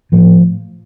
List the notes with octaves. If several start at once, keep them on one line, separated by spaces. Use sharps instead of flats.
A2 F3